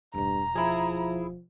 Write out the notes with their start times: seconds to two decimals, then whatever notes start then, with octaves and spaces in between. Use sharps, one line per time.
0.14 E1 D2 G2 A#5
0.55 F3 E4 G#4